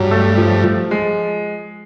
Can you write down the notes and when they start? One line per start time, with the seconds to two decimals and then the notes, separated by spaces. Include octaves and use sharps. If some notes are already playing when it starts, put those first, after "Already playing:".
Already playing: G2 F#3
0.11 A3
0.38 F3
0.64 F3
0.91 G#3